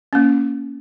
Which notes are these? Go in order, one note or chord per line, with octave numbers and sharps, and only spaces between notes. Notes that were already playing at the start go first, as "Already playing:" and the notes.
A#3 C#4